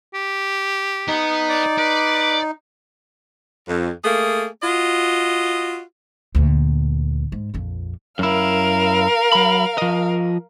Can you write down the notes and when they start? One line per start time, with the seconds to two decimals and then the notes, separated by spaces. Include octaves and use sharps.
0.14 G4
1.08 B3 D#4
1.49 D5
1.78 B4 D5
3.68 F2
4.04 A3 A#3 G#4
4.62 F4 F#4 D#5
6.35 D2 A#2
7.32 G#2
7.54 A#1 F2
8.19 F#2 E4 A#4 F5
9.32 F#3 B5
9.78 F3 D#5